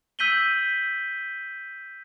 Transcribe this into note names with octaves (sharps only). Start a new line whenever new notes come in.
E6 G6 B6 D#7 F#7 G7